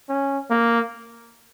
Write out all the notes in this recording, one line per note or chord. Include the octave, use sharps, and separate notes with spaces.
C#4
A#3